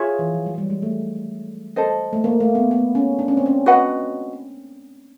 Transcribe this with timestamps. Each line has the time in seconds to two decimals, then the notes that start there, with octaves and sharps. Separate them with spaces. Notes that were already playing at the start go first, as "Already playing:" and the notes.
Already playing: F4 G#4 C#5 E5
0.19 E3
0.34 F3
0.46 F#3
0.58 G3
0.70 G#3
0.82 A3
1.76 A4 C5 D#5
2.13 A3
2.24 A#3
2.40 A3
2.55 B3
2.71 B3
2.95 C#4
3.19 D4
3.28 C#4
3.37 C4
3.46 C#4
3.66 F#4 B4 D#5 F#5